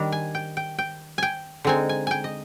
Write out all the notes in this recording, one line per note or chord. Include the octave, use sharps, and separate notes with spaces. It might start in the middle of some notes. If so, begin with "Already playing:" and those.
Already playing: D#3 G3 D4 A#5
G#5
G5
G5
G5
G5 G#5
D3 G#3 C4 D#4 G#5
G#5
G5 G#5
D#5